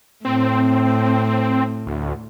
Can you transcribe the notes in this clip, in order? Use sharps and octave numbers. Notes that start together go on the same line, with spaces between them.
A2 C4
D2